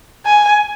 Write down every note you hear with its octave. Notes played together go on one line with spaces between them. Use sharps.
G#5